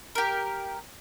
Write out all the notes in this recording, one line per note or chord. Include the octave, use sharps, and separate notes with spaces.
G4 A#4